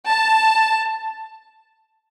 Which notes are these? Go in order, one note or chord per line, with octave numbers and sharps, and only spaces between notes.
A5